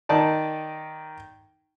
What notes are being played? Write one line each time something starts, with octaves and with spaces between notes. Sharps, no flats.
D#3 D#4 D5 A5